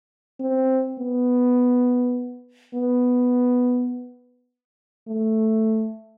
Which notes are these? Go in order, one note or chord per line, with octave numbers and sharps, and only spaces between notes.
C4
B3
B3
A3